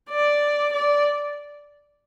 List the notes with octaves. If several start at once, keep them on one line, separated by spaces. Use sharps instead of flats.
D5
D5